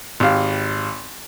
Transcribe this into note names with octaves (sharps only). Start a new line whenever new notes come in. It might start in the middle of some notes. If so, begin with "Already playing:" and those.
G#1 G4 F5